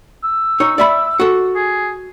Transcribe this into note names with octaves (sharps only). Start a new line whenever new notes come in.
E6
D#4 C#5
D5 E5 B5
F#4 A4
G#4